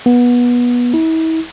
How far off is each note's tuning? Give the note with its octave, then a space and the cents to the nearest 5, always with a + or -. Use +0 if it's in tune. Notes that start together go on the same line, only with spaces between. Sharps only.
B3 -20
E4 -40